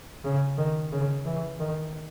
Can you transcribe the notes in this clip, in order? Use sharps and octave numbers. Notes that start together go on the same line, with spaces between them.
C#3
D#3
C#3
E3
D#3